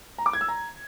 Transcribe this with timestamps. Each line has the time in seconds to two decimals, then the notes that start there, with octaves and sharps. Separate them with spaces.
0.18 A#5
0.26 D6
0.33 G#6
0.41 E6
0.48 A#5